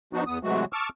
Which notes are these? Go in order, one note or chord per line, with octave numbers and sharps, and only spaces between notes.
F3 B3 D4 D#4 F#4
E2 B3 D#6
C3 E3 F#3 G#3 A3 F#4
A5 C#6 D6 E6 F6